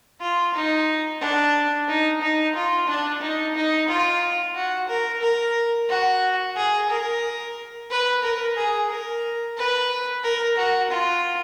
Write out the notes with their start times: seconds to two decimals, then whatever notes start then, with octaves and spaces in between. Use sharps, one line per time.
0.21 F4
0.54 D#4
1.21 D4
1.88 D#4
2.22 D#4
2.55 F4
2.88 D4
3.22 D#4
3.55 D#4
3.88 F4
4.55 F#4
4.88 A#4
5.22 A#4
5.89 F#4
6.57 G#4
6.90 A#4
7.90 B4
8.23 A#4
8.56 G#4
8.90 A#4
9.58 B4
10.24 A#4
10.58 F#4
10.91 F4